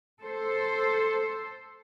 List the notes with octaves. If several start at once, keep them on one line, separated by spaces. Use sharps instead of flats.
A4 C5